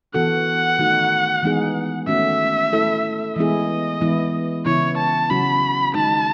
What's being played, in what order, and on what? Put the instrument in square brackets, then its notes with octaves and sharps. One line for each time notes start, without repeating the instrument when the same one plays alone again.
[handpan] E3 B3 F#4 A4 [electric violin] F#5
[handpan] D#3 A3 D#4 F#4
E3 G#3 B3 D#4 G#4
[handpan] D#3 A3 C#4 F#4 [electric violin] E5
[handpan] A3 E4 A4
[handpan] E3 G#3 B3 E4 G#4 [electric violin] D#5
[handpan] E3 G#3 B3 E4
[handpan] C#3 E3 B3 E4 [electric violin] C#5
[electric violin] A5
[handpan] C#3 F#3 C#4 F#4 [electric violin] B5
[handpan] D#3 G#3 D#4 [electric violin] A5